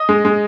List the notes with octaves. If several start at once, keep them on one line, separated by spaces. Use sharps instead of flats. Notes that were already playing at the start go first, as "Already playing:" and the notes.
Already playing: D#5
G#3
G#3